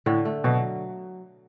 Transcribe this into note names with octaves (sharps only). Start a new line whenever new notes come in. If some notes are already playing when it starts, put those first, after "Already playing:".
A2 D3
A3
B2 F#3